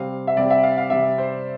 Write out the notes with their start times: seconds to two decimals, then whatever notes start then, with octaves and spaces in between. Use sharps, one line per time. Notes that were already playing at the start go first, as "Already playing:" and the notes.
Already playing: C3 G3 C4 F5
0.27 E5
0.36 C3 G3 C4 D5
0.50 E5
0.63 F5
0.77 F5
0.90 C3 G3 C4 E5
1.18 C5